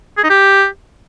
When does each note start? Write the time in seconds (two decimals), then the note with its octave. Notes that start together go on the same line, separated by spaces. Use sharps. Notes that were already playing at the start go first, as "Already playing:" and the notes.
0.18 G#4
0.24 D#4
0.30 G4